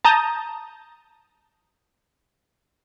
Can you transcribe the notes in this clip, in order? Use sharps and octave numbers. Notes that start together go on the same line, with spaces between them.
A5 A#5 D#6 G6